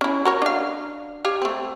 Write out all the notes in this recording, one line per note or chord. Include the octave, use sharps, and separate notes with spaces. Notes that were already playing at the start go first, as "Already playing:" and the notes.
C#4 E4
F#4 A#4 C#5
D4 F5
G4 C#5 F5
A3 C4